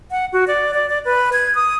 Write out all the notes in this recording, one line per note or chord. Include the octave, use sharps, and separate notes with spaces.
F#5
F#4
D5
D5
D5
B4
G#6
D#6